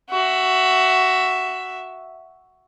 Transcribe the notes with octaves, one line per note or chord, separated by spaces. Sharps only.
F#4 E5